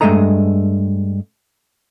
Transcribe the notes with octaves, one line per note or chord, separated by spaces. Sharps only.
G2 F3 G#3 A3 D#5 A#5